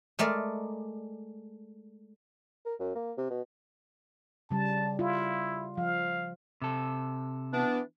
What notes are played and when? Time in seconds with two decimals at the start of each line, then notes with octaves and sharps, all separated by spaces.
0.19 G#3 A3 A#4 D5
2.65 A#4
2.80 F#2
2.95 A#3
3.18 C3
3.30 B2
4.51 C#3 G3 A5
4.99 E4 F4
5.77 F3 F5
6.62 C3 A4
7.53 E3 B3 D4